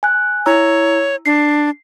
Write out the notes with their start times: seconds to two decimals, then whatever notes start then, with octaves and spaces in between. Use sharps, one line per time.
0.03 G#5 F#6
0.46 E4 C#5 A#5 E6
1.26 D4 C7